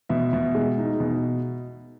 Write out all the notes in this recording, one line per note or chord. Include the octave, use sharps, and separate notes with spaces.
B2 E5
B2
G#3
D#4
B2